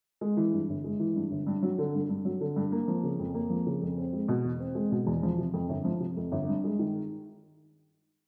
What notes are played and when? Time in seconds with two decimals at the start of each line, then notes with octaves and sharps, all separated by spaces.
0.21 G#3
0.37 E3
0.53 G2
0.69 G1
0.84 G#3
1.00 E3
1.16 G2
1.31 G1
1.47 G2
1.63 F#3
1.78 D3
1.94 G2
2.09 G2
2.25 F#3
2.41 D3
2.56 G2
2.72 A#3
2.88 F3
3.03 C#3
3.19 F2
3.34 A#3
3.50 F3
3.67 C#3
3.82 F2
3.98 C4
4.13 G#3
4.28 B2
4.44 E2
4.60 C4
4.75 G#3
4.92 B2
5.07 E2
5.23 F3
5.38 C3
5.54 F2
5.69 G1
5.85 F3
6.00 C3
6.17 F2
6.32 G1
6.48 G2
6.64 G#3
6.79 D#3